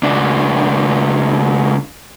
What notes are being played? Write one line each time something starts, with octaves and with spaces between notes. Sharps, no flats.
C#2 D4